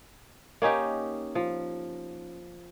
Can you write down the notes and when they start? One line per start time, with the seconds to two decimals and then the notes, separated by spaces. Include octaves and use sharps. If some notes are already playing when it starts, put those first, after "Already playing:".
0.62 A#3 C#4 D#4 G4
1.35 F3